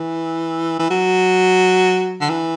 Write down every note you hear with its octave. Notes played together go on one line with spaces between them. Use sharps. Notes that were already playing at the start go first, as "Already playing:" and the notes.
Already playing: E3
E3
F#3
D3
E3